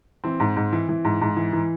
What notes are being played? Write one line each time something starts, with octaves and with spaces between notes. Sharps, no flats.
E3 C4
G#2
G#2
E3
E3
G#2
G#2
E3
E3